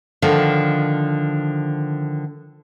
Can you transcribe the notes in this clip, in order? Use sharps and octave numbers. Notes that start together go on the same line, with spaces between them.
D3 D#3 F3